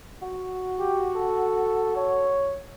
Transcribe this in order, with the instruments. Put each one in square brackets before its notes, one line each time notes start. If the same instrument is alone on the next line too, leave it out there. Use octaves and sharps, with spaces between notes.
[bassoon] F#4
[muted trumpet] G4
A4
C#5